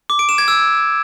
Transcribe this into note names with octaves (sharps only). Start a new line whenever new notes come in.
D6
D7
E7
G#6
E6